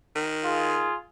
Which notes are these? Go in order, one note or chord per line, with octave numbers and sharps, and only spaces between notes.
D#3
F4 G#4